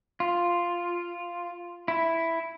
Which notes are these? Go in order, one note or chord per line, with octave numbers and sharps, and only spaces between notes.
F4
E4